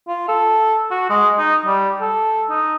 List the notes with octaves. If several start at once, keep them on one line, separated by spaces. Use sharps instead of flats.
F4
A4
F#4
G#3
D#4
G3
A4
D#4